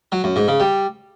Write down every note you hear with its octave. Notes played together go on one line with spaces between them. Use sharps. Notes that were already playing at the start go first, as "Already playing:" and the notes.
F#3
F#2
G#2
C#3
G3